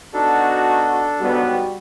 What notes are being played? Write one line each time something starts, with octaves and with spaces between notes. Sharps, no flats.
B3 D4 D#4 F#4 A4
B1 G#2 G3 B3 F#4